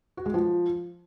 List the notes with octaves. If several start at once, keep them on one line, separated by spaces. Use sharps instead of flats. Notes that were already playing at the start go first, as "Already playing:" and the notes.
F#4
G#3
F3